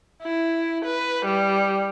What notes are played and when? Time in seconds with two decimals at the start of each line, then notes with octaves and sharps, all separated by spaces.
0.23 E4
0.84 B4
1.25 G3